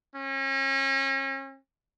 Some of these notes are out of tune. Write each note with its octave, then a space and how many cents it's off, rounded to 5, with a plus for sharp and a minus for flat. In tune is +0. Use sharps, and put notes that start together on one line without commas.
C#4 -35